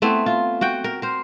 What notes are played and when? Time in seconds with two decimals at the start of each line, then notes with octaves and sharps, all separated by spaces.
0.02 A3 B3 C4 E4
0.26 F4
0.61 F#4 F#5 G5
0.84 A#4
1.02 A#4 C5